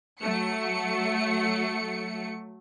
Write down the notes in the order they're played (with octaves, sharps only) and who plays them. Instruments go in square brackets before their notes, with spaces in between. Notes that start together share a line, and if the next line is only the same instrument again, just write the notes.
[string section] F#3 A3 C#7